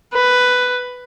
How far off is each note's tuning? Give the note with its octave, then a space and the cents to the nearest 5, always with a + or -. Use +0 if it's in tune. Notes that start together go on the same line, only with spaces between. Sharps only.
B4 +5